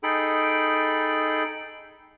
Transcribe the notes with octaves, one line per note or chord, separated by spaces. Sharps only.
D#4 G#4 A4 G5 B5